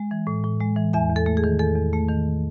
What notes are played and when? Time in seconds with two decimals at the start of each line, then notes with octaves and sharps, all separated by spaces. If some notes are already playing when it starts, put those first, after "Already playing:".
Already playing: G#3
0.11 E3
0.27 A2
0.44 A2
0.60 G#3
0.76 E3
0.93 E2 E5 G#5
1.10 E2
1.16 A4
1.26 A3
1.37 G#4
1.44 D#3
1.59 E2 A4
1.76 E2
1.93 A3
2.09 D#3